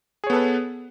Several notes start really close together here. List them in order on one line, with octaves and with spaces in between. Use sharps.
G#4 C#5 B3 A4 B4